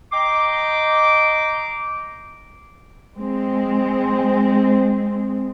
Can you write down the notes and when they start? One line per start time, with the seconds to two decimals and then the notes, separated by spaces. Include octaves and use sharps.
0.12 D#5 G5 A#5 C6 D6
3.16 G#3 C4